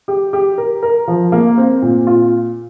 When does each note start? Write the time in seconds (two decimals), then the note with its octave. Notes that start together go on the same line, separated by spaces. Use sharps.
0.08 G4
0.33 G4
0.58 A#4
0.83 A#4
1.08 F3
1.32 A#3
1.58 C4
1.82 A#2
2.07 F4